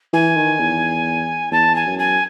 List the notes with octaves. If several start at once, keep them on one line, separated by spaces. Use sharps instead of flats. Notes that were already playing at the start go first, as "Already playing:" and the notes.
E3 G#5
D#3
E2
E2 A5
G#5
F#2
G#5